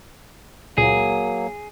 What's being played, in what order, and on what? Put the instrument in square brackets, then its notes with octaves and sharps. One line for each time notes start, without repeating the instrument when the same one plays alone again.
[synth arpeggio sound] C#2 A#2 [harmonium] F#3 A#3 [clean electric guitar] G#4